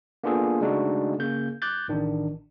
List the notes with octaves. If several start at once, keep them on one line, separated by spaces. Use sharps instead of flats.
A#3 B3 D4 F4 G#4 A4
C#3 G#3 A3 D4 D#4 F#4
C#3 A#3 G6
D6 F#6 G6 A6
A1 D#3 D4